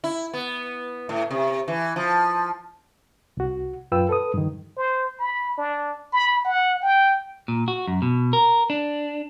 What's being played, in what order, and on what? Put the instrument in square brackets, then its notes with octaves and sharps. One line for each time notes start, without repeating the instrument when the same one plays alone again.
[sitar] E4
B3
A2
C3
E3
F3
[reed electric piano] C2 F#4
F#2 F4 B4 G5 E6
A4 B4 D#6
G2 D#3
[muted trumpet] C5
B5
D4
B5
F#5
G5
[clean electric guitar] A#2
F#4
F#2
B2
A#4
D4